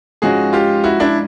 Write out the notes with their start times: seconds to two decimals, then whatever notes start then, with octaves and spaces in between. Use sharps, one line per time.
0.22 G#2 F3 G#3 C#4 F#4 G#4
0.53 F4 G4
0.84 E4 F#4
1.00 D4 E4